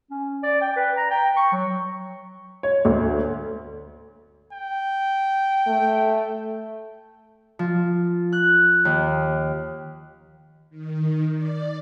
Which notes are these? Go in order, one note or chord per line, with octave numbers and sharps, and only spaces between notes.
C#4
D5
G5
B4
A#5
G5
C#6
F#3
C#5
D2
G5
A3
F3
F#6
D#2
D#3
D5